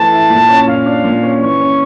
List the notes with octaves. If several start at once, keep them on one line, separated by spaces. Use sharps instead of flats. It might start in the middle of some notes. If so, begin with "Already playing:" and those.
Already playing: E3 A3 A5
E4
A#2
C#4
A#2 F5
D4
A#2
C#4
E3 C#6
C#4